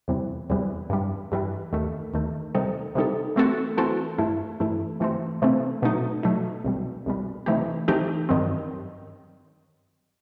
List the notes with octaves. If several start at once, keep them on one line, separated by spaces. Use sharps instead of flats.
E2 C3 E3 G3
E2 C3 E3 G3
G2 E3 G3
G2 E3 G3
D#2 D#3 A3
D#2 D#3 A3
C3 D#3 G3 D#4 A4
C3 D#3 G3 D#4 A4
E3 A3 C4 F#4 A4
E3 A3 C4 F#4 A4
G2 E3 A3 E4
G2 E3 A3 E4
C3 E3 A3 C4
C3 E3 A3 C4
B2 F#3 A3 D#4
B2 F#3 A3 D#4
C2 B2 G3
C2 B2 G3
C3 E3 A3 D#4 G4
C3 E3 A3 D#4 G4
G2 D#3 F#3 C4